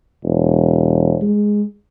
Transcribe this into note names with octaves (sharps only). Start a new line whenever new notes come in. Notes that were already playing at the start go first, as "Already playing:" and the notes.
E1
G#3